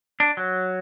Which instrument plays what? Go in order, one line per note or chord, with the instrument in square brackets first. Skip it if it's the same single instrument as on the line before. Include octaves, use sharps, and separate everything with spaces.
[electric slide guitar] D4
F#3